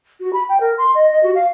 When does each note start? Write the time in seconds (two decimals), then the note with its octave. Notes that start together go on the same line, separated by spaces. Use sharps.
0.20 F#4
0.33 B5
0.48 G5
0.60 A#4
0.77 C6
0.94 D#5
1.10 D#5
1.23 F#4
1.35 F5